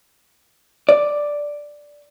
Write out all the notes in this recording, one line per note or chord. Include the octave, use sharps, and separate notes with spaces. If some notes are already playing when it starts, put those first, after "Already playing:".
D5